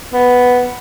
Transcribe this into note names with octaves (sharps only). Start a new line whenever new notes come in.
B3